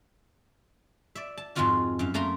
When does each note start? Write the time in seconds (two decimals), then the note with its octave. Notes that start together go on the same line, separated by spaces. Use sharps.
1.15 D5 E5
1.37 A5
1.55 F2 G#2 G#3 C4 F4 F#4
1.99 F#2 F5
2.14 F#2 A3 A#3 A#5 C6